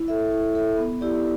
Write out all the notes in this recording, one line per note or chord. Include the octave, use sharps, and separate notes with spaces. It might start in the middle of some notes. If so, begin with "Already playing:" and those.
Already playing: E4
A4 E5
E4
A4 E5
B3
E4 G4 D5